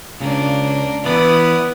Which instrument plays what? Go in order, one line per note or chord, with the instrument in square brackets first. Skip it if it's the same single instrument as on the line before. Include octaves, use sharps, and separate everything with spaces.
[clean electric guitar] C#2 C#3 [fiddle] A#3 D4
[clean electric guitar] E3 D5 [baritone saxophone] B3 [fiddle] E4 D#6